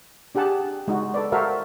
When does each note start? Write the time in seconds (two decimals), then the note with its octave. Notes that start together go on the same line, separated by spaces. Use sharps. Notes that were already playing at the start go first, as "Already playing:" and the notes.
0.35 D4 G4 G#4 F#5 A5
0.88 G#3 D#4 F#4
1.14 A4 B4 D5
1.32 F#4 A4 A#4 C5 E5 F5